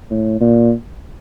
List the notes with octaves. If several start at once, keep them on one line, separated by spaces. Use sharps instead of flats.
A2
A#2